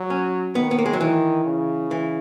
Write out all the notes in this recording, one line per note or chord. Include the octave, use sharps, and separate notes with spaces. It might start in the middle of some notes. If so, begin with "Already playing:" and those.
Already playing: F#3
C#4
D#3 B3
B3
A#3
G#3
F#3
D#3 E3
C#3
E3